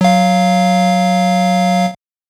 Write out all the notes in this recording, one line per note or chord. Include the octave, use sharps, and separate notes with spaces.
F#3 F5